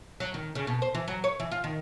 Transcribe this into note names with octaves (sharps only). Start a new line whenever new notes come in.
F#3
D#3
C#3
B2
C5
E3
F#3
C#5
E3
F4
D#3